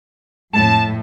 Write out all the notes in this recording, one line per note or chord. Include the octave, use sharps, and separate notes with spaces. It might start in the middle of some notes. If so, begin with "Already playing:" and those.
F2 A2 A5